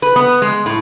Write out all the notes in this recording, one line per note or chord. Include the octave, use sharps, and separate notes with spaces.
B4
B3
G#3
A2